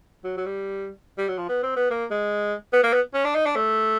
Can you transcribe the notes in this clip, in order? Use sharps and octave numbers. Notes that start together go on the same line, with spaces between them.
F#3
F#3
G3
G3
F#3
F3
B3
C4
B3
A#3
G#3
B3
A#3
B3
C#4
D4
D#4
D4
A3